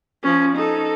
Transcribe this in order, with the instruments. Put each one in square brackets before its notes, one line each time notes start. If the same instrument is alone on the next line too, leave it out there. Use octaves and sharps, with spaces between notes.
[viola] F3 C#4
D#4 A4